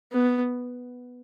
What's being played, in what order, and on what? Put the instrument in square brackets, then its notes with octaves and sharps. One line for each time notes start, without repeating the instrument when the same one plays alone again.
[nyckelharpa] B3